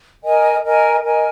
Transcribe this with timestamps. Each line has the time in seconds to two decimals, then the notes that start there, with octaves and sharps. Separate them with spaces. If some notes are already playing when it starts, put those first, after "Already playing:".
0.24 A#4 D#5 G#5
0.64 A#4 D#5 G#5
1.04 A#4 D#5 G#5